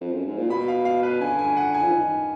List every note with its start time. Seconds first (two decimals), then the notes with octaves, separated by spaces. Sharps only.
0.01 F2
0.13 F#2
0.26 G#2
0.38 A#2
0.50 B2 B5
0.68 F5
0.85 F5
1.03 B4
1.21 D3 G#5
1.39 G#5
1.57 F#5
1.74 G#5
1.83 F3
1.92 D#3